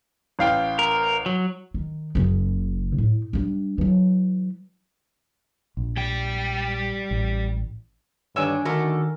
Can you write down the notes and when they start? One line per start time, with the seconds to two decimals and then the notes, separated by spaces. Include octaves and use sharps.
0.39 A1 F5 G5
0.79 A#4
1.26 F#3
1.74 D#3
2.15 F#1 C#3
2.98 A2
3.33 G3 D4
3.78 E3 F#3
5.77 A#1
5.97 G3 G5
7.11 A1
8.36 G2 D3 D#3 D4 C#5 G#5 E6
8.65 D3 D#3 A3 F#4 A4 A#4